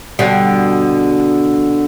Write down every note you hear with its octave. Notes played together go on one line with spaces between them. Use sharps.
B2 D3 G3